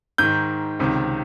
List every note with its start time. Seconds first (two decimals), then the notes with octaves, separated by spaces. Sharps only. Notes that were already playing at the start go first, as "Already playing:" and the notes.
0.18 G#2 D#3 G6
0.79 C#2 C3 D#3